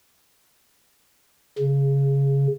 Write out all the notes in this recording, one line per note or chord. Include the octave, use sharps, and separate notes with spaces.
C#3